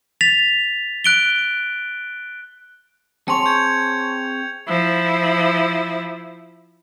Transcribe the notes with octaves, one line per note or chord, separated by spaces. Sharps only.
A6 B6 F7
F#6 D7 G7
C4 G#4 C#5 A5 C6 C#6 C#7 F7
G6 G#6 C#7
F3 E4